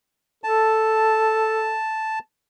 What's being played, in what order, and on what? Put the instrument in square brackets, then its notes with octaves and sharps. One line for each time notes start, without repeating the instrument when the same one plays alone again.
[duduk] A4 [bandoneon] A5